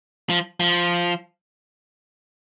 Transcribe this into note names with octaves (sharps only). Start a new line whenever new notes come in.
F3
F3